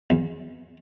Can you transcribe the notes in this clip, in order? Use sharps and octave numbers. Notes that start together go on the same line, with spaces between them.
E2